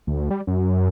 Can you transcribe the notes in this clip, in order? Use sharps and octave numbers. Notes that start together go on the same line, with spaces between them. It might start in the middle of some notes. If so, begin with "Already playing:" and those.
D2
G3
F#2